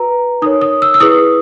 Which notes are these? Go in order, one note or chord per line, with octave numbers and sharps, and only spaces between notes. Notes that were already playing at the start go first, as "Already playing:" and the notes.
Already playing: F#4 B4 A#5
D#4 A#4 C#5 D#6
D#6
E6
E6
E4 G#4 B4 D#6